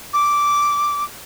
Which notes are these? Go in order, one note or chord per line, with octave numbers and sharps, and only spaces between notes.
D6